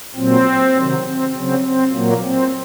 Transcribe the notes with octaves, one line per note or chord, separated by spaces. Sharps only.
A#2 F#3 C4
C3 D#3 F#3
C4
C#3 F#3 C4
C4
A#2 F#3 A#3
C4